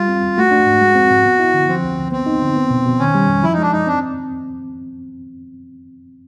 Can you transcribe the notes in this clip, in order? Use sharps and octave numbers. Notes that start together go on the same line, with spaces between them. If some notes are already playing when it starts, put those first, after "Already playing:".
Already playing: G3 F4
C4
D#2
A3 F#4
D4
G#2
G#3
C4
G#2
B3
E4
D3
F3 C4
D2
D2
B3 C4
D#4
D3
B3
B2
B2
D#3 C#4
G3
F2
F3 E4
D#4
G#3 D4
F#2 D#4
C4 D4